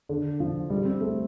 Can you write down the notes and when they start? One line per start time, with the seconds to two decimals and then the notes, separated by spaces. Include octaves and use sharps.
0.09 D3
0.40 F3
0.70 G3
0.85 C4
1.01 A3